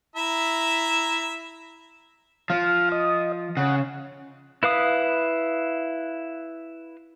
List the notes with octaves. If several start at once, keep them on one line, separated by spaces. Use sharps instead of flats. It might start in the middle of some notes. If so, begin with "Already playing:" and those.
E4 E5 A#5
F3 F5
D#5
C#3 F#5
E4 B4 F5 D#6